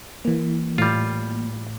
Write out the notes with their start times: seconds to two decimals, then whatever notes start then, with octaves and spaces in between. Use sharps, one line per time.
0.25 E3 A#3
0.78 A2 G3 F4